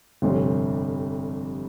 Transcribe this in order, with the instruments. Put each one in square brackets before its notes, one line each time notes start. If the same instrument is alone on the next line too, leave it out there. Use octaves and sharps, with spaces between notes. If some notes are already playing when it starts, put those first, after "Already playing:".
[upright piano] G1 F2 C3 G3 C4